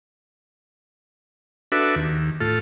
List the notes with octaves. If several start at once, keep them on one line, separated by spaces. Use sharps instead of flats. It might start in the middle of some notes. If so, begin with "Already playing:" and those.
D4 F#4 A4 B4 E5
D#2
A2 F4 A4